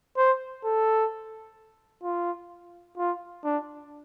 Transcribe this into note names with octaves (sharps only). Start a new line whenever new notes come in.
C5
A4
F4
F4
D4